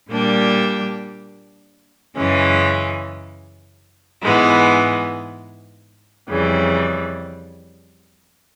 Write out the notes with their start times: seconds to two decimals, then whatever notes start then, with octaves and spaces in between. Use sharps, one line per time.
0.10 A#2 G3 A#3 D4 G4
2.16 F#2 C#3 E3 G#3 C#4
4.22 G#2 E3 G#3 B3
6.29 F2 C#3 E3 G3